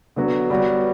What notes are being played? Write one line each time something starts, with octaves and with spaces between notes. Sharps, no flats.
D3 F#3 B3 F#4
G3 B3 F#4 C#5